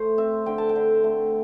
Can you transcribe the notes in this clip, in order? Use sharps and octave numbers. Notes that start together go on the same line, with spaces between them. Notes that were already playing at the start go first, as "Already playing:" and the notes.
Already playing: A3 C5
C4 E5
D3 G5
A5
G5
D3
A3